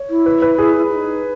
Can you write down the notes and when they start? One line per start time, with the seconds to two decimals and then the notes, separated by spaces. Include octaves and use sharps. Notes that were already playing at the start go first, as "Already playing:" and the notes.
Already playing: C#5
0.09 E4
0.26 B4
0.42 B4
0.58 G#4
0.90 E4
0.95 D#4